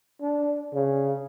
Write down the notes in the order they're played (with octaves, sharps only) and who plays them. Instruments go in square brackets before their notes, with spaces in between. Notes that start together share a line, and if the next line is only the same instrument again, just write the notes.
[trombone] D4
C#3